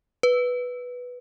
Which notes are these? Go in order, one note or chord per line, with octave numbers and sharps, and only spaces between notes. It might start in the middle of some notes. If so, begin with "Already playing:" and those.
B4